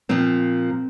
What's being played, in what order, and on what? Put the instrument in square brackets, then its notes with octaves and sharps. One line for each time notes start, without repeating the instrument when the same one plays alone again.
[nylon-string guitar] A#2 F3 C4